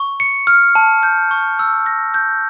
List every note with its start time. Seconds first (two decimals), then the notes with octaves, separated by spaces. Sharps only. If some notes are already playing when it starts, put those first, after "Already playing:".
Already playing: C#6
0.20 C#7
0.47 F6
0.75 A5
1.03 G6
1.31 C#6
1.59 E6
1.86 A#6
2.14 G6